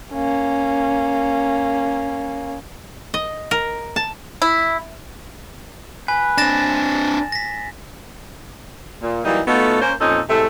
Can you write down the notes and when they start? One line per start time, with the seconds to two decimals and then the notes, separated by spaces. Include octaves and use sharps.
0.13 A#3 C#4
3.14 D#5
3.51 A#4
3.96 A5
4.42 E4
6.08 B4 G#5
6.38 C4 D4 A6 A#6 E7
7.32 A#6 B6
9.03 A#2
9.25 E3 F#3 G3 A#3 D#4
9.47 A3 B3 D#4 F4 F#4 A4
9.82 A#3 C#4 C5
10.00 F2 A#2 C#4 D#4 A4 D#5
10.29 A2 C3 G#3 A3